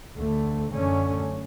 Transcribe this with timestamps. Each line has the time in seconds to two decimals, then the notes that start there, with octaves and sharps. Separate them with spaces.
0.18 D2 D3 A3
0.73 F#2 D3 A3 C#4